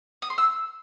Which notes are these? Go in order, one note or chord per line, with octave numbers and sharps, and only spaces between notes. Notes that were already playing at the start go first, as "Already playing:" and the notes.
D#6
C6
E6